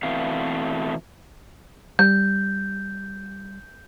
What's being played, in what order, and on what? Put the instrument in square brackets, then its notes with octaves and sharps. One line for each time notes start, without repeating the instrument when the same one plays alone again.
[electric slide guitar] B2 E3 A3 C4 F5
[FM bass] G3 [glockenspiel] G6